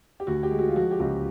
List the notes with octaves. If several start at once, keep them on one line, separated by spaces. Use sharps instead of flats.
G4
D2 F#4
G4
G#3
F#4
F4
F3 F#4
G4
C#2 F#4